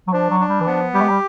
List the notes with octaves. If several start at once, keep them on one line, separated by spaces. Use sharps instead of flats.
F#3
F3 D4
F#3
D4
G3
E3
F3 B3
G3 G4
G#3
G3